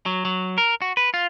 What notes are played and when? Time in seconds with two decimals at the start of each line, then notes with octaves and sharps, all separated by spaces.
0.06 F#3
0.25 F#3
0.58 A#4
0.82 F#4
0.97 B4
1.14 F4